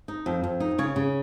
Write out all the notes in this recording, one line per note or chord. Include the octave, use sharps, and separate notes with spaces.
D#4
F2
F2
D#4
C#3 C#5
C#3